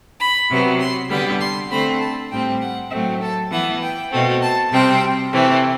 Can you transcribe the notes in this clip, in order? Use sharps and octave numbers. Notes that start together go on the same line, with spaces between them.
B5
C3 F#3 B3
C6
D3 G3 B3 B5
C6
D3 A3 C4 B5
A5
A2 G3 C4 G5
F#5
A2 F#3 A3 C4 E5
A4
E3 B3 F#5
G5
B2 A3 C4
A5
C3 G3 C4 G5
C3 E3 A3 C4